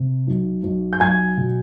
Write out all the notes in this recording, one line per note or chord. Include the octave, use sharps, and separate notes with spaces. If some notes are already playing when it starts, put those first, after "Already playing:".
Already playing: C3
B1
B1
G6
F#3 G#5 G#6
B2